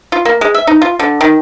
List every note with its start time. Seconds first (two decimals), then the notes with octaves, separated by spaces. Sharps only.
0.12 F4
0.25 A#3
0.41 G#3
0.54 E5
0.67 D#4
0.82 F4
0.99 D3
1.21 D#3